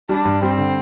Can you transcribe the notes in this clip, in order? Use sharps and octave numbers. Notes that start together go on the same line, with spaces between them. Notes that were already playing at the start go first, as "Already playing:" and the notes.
G3 D4
G2
G3 C4
D3